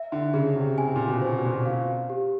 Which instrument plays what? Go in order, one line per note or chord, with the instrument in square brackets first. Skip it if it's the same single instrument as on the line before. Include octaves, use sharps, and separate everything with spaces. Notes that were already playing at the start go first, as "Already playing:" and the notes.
Already playing: [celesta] E5
[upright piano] D3
[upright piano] C#3 [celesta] G#4
[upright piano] C3
[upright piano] C3 [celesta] G#5
[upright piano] A#2
B2
[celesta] C5
[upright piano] B2
A#2
B2
[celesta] F5
G4